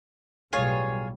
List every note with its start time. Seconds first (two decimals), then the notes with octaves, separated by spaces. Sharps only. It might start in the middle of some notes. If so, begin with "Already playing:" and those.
0.53 B1 A2 G3 F4 G#4 C#5